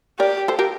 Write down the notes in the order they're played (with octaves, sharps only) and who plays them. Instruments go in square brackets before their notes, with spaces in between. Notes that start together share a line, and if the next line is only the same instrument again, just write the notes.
[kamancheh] G4 [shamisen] A#4 D5
[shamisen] A4 C5
G4 A#4